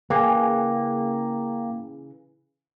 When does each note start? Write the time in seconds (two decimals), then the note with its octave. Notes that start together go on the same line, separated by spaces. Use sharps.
0.10 C#3 E3 A#3 G#4 G5 D6